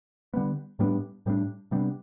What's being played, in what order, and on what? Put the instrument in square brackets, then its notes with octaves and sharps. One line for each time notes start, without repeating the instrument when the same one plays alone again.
[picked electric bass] D3 G3 B3
A2 G3 B3 D4
A2 G3 B3 D4
C3 G3 B3 D4